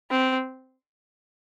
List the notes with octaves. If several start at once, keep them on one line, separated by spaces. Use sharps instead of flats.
C4